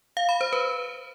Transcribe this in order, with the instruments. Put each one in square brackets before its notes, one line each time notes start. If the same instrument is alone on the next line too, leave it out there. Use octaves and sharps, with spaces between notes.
[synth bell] F5
B5
C5
B4